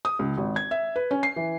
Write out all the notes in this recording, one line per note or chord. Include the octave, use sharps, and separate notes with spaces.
D#6
C#2
G#1
G#6
E5
B4
C#4
C7
E3